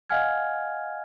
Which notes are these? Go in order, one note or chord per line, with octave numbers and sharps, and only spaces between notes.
D#5 F5 F#5 G#5 F6 G#6